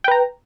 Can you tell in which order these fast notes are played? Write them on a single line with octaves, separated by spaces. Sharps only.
G5 B4 A#5